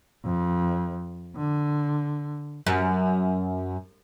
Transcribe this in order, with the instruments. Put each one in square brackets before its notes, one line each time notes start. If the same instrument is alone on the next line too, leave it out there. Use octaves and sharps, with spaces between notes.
[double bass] F2
D3
[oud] F#2